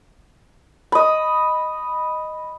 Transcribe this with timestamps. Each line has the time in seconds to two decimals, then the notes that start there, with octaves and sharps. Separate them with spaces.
0.92 D#5 B5